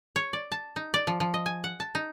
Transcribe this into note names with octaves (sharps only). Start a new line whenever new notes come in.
C#5
D5
A5
D#4
D5
F3
F3
D#5
G#5
F#5
A5
D#4